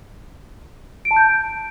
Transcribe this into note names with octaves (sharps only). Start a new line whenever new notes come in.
D7
A5
G6